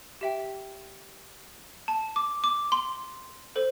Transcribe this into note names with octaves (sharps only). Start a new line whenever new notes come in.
G4 E5 G5
A5
D6
D6
C6
A4 C5